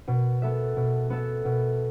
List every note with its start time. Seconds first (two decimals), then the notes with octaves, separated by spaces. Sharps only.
0.07 B2
0.42 B3 A4 E5
0.76 B2
1.10 B3 A4 E5
1.45 B2